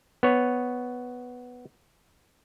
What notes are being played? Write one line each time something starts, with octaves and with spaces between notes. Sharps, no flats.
B3 C#5